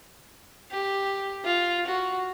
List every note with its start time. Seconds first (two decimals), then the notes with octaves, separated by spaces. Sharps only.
0.71 G4
1.45 F4
1.87 F#4